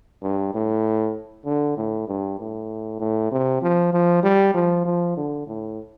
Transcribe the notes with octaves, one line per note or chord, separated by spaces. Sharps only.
G2
A2
D3
A2
G2
A2
A2
C3
F3
F3
G3
F3
F3
D3
A2